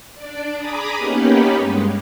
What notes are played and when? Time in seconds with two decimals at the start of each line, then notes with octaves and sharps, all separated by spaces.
0.14 D4 D5
0.57 G#4 G#5 A#5 B5 D6 D#6
0.96 A#3 B3 C#4 D#4 G4 B4
1.58 G2 G#3